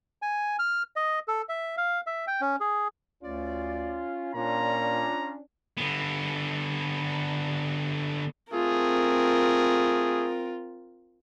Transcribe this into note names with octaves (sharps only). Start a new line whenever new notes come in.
G#5
F6
D#5
A4
E5
F5
E5
G5
C#4
G#4
D2 C#4 F4 D5
A#2 C#4 D4 F4 A#5
D3 B3
A3 C4 F4 G#4 A#4